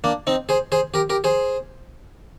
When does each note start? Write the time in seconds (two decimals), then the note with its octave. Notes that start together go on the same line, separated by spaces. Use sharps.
0.04 A#3 D4
0.27 C4 D#4
0.49 G#4 C5
0.72 G#4 C5
0.94 G4 A#4
1.10 G4 A#4
1.24 G#4 C5